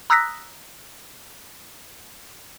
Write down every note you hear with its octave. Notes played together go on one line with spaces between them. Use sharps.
A#5 D#6 E6 F#6 A#6 B6